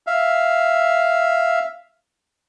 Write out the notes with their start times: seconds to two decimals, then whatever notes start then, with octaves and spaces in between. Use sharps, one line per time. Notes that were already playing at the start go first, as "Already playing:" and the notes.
0.07 E5 F5